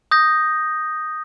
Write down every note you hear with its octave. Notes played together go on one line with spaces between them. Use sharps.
D#6 G6 A#6